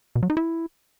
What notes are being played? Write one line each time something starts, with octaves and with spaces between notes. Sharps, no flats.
B2
F#3
D#4
E4